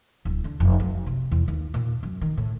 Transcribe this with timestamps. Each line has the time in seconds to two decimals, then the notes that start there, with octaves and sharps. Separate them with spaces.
0.25 D1
0.44 D3
0.60 F1
0.80 F#3
1.06 C3
1.32 E2
1.48 D#2
1.74 A#2
2.03 F#2
2.21 D#3
2.37 A2